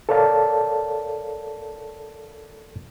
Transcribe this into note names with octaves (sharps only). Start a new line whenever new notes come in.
A4 A#4 C#5 D5 F5 A5